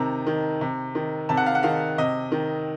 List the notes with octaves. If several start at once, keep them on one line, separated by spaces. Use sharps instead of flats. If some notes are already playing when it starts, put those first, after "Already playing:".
Already playing: C3 D#3 A5 A#5
D#3
C3
D#3
C3 A5
F#5
F5
F#5
D#3 F5
C3 D#5
D#3